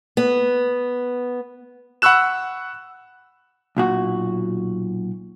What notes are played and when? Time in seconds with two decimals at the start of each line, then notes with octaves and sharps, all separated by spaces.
0.17 B3
2.02 F#5 B5 C#6 E6 F#6 E7
3.76 B1 A#2 F#4